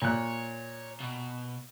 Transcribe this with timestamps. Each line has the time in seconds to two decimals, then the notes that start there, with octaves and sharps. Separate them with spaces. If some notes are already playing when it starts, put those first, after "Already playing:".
0.02 A#2 C#5 F#6
1.00 B2